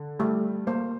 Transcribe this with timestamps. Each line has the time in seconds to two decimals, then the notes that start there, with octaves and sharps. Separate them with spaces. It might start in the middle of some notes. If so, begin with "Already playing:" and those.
Already playing: D3
0.19 G3 A3
0.67 A#3 C5